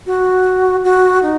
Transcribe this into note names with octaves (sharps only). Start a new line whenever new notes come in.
F#4
F#4
D#4